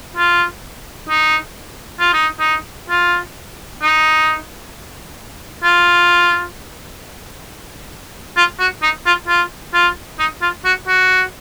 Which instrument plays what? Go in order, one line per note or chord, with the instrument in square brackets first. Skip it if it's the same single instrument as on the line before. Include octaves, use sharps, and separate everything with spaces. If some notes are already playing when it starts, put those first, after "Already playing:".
[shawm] F4
D#4
F4
D#4
D#4
F4
D#4
F4
F4
F#4
D#4
F4
F4
F4
D#4
F4
F#4
F#4